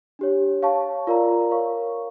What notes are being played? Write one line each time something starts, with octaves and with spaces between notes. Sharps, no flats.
D4 G4 C#5
C#5 F5 A5 C#6
F4 A#4 D5 F5 A#5
A#4 C#5 F5 C#6